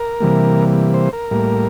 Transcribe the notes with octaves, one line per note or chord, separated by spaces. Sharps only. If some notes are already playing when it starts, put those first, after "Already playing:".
Already playing: A#4
C3 E3 G3 A#3
C5
A#4
A2 G3 A#3